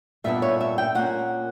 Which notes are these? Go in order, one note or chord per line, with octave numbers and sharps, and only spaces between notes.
A#2 G3 B3 D4 E5
C#5
E5
G5
A#2 A#3 C#4 F#5